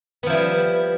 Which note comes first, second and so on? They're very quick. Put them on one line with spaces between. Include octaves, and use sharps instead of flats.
B3 F3 E4 G3